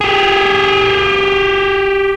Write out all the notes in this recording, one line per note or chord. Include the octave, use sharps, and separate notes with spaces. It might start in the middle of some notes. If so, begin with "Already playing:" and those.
G4 G#4